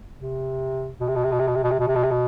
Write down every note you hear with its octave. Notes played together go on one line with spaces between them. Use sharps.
C3
B2
C3
B2
C3
B2
C3
B2
C3
B2
C3
B2
C3
B2
C3
B2